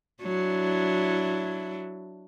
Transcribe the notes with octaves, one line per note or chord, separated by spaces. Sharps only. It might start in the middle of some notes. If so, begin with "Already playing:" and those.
F#3 D4 E4